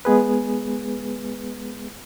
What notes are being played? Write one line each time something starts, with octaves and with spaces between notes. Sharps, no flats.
G#3 B3 G#4 B4